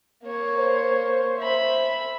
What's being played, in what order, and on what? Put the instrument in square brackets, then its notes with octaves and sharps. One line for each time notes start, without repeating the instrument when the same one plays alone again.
[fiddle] A#3 C#5
[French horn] C5
[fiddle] E5 B5